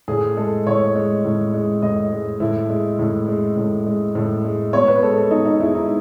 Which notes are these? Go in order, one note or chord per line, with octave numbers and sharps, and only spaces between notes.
A2 G#4
G#3 A4
A2 C#5
G#3
A2
G#3
A2 D#5
G#3
A2 E4
G#3
A2
G#3
A2
G#3
A2
G#3
B2 C#5
B4
G#3 A4
A4
B2 D#4
D#4
G#3 E4
D#4